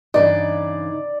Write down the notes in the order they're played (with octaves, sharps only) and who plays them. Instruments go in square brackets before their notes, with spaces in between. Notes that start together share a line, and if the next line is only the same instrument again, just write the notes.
[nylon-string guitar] G2 C#3 E3 [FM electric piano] D#4 [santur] D5